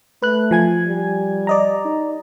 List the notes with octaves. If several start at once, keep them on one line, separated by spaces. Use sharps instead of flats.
A3 B4 F#6
F3 G#5 G#6
G3
D5 D#5 A#5
D#4